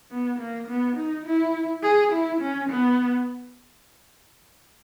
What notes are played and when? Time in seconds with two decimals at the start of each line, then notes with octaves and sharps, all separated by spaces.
0.11 B3
0.39 A#3
0.68 B3
0.97 D#4
1.26 E4
1.83 G#4
2.12 E4
2.41 C#4
2.70 B3